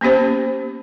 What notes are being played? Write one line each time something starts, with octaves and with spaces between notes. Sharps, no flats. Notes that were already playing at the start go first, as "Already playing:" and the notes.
A#3 B3 C#4 G4 C5